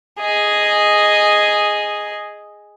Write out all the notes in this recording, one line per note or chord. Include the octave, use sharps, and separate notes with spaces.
G#4 D#5